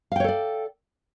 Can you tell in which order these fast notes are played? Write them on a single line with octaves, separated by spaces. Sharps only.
F5 G5 C#5 A4 D5